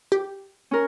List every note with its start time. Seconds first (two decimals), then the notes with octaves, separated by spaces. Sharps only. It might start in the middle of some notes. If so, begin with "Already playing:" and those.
0.12 G4
0.71 C#4 A#4